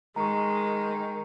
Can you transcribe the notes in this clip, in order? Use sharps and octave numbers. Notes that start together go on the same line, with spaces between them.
D#3 G#3 A#5 C#6